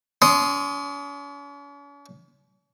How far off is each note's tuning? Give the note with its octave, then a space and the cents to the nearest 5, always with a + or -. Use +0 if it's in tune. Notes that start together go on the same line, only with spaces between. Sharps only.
C#4 +45 C6 +0 D#6 +0